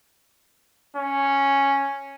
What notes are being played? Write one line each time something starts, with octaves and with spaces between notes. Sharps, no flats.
C#4